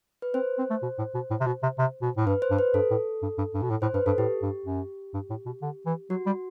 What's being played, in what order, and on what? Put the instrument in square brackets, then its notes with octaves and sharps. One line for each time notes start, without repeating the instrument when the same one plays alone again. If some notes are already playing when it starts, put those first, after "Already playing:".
[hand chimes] B4
[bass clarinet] C4 [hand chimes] C5
[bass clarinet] C4
A3
B2
A2
B2
A2
C3
B2
C3
C3
B2
A2
[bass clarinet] G2 [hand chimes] B4
[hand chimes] C5
[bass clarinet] G2
[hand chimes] B4
[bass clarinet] G2 [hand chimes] A4
[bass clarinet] A2
G2
G2
G2
B2
A2
[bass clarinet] A2 [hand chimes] C5
[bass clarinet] G2 [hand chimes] B4
[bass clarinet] G2 [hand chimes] A4
[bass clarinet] A2 [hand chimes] G4
[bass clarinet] G2
F#2
G2
A2
B2
D3
E3
[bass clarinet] F#3 [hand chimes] F#4
[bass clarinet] G3